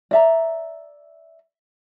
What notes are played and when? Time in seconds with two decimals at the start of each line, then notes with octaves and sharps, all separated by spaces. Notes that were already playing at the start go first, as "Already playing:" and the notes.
0.11 D5 E5 A#5